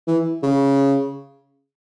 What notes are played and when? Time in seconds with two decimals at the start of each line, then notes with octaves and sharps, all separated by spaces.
0.07 E3
0.43 C#3